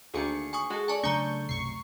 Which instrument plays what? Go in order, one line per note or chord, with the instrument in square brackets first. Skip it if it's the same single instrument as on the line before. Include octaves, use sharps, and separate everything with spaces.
[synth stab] D2 C#7 [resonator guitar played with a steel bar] D#3 A#3 G#4
[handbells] G#5 C#6 D#6
[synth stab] G#3 [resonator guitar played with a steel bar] F#4 A4
[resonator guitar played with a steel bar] A4 C#5 D5 [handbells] G#5 A5
[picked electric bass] C#3 F#3 D4 [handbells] A3 A#5 [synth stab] C#6 G6
[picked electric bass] B1 F#2 C3 [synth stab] C#6 C7